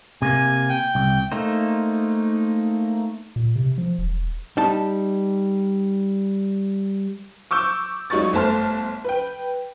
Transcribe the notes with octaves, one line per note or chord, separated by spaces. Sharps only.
C3 A#3 G#5
G5
C2
A3 A#3 D#4 C5
A#2
C3
F3
E1
G3 D#4 A5
C#6 D6 E6 G6
C#2 F#3 D#4 D5 C#6 A6
G1 A3 C5 A5 C6 F6
B4 G5